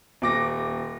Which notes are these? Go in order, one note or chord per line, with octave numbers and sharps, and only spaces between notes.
D#1 D6 A#6